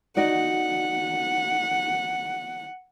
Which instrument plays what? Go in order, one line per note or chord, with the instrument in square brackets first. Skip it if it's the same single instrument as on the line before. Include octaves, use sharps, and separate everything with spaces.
[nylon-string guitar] D#4 F#4 D5 [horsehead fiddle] F#5